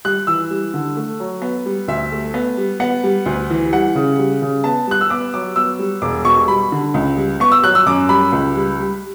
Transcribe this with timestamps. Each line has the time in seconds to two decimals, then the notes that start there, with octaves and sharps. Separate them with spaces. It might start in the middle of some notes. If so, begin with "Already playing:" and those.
0.05 G3 F#6
0.27 E3 E6
0.51 G3
0.74 D3
0.97 A3
1.20 F#3
1.42 B3
1.66 G3
1.88 D2 E5
2.12 A3
2.34 B3
2.57 G3
2.80 B3 F#5
3.04 G3
3.26 D2
3.50 E3
3.72 G3 F#5
3.95 C#3
4.19 G3
4.42 C#3
4.64 B3 A5
4.87 G3 F#6
5.01 E6
5.10 B3 D6
5.34 F#3 D6
5.56 B3 E6
5.79 G3
6.02 E1 D6
6.25 B2 C#6
6.48 G3 B5
6.72 D3
6.94 C#2
7.17 G3
7.40 B3 C#6
7.52 E6
7.63 F#3 F#6
7.75 E6
7.86 F#2 D6
8.09 G3 B5
8.32 C#2
8.55 G3
8.79 G3